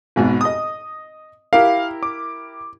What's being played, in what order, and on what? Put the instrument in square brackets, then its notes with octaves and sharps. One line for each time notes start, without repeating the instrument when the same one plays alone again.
[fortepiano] G#1 G#2 B2
D#5 D#6
[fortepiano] E4 G4 A#4 [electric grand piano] F5
[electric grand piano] D6